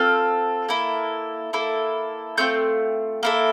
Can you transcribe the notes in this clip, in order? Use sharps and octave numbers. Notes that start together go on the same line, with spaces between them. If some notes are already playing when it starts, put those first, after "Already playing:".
Already playing: C4 F4 A4 F6
A#3 E4 A4
A#3 E4 A4
A3 C4 F4 G6
A#3 E4 A4